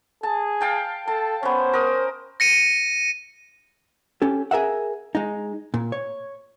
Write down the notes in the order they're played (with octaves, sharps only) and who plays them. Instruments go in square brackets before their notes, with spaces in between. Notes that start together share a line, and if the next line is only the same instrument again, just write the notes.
[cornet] G#4 [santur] A5
[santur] F5 G5 A5
[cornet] A4 [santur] A5
[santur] B3 C#4 [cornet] C5
[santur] A#4 D#6
[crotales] A#6 C#7 D#7
[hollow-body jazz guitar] C#4 G4 A4
G#4 A#4 E5 F#5
G#3 D#4
A#2
C#5